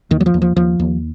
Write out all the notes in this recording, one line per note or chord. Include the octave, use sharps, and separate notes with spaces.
D#2 D#3
F#3
F3
D#2
F3
D#2 F3
D#2